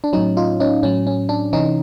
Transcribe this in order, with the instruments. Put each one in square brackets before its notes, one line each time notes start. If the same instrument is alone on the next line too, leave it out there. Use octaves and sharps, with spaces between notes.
[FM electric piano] D4
A2 F#3 C#4 D#4
D#4 F4
C#4 D#4
A2 F#3 C#4
C#4
D4
C3 E3 C#4 D#4